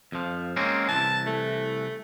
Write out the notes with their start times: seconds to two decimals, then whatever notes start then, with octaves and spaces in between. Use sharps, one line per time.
0.12 F2 F3
0.57 G#3 A#3 C4 C#4
0.89 C2 E3 A5
1.27 A3